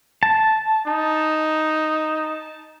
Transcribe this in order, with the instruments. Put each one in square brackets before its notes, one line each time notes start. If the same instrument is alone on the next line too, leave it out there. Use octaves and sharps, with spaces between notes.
[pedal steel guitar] A5
[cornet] D#4